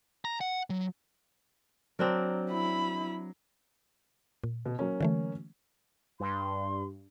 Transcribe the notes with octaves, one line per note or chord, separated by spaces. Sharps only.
A#5
F#5
F#3
F#3 C4 D4 A#4
E4 B5
A#2
B2
F#3 A#3 C#4
D3 E3 A3
G2 C6